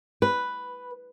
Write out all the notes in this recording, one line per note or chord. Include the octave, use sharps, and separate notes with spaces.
B4